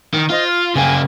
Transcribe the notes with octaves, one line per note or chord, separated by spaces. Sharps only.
D#3
F4 C5 D#5
F6
C#3 A#3 G5 G#5